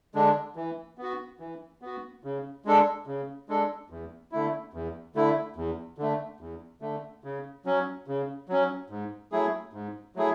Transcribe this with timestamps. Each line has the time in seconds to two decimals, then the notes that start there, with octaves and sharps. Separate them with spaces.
0.14 D3 G#3 D4
0.56 E3
0.98 B3 F#4
1.40 E3
1.82 B3 F#4
2.24 C#3
2.65 G#3 D4 A4
3.07 C#3
3.49 G#3 D4 A4
3.90 E2
4.32 D3 A3 E4
4.73 E2
5.15 D3 A3 E4
5.56 E2
5.98 D3 A3
6.40 E2
6.81 D3 A3
7.24 C#3
7.65 F#3 C#4
8.07 C#3
8.49 F#3 C#4
8.90 G#2
9.32 F#3 A3 E4 G#4
9.73 G#2
10.16 F#3 A3 E4 G#4